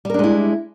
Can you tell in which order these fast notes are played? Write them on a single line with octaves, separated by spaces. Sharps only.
G3 A#4 D4 G#3 E4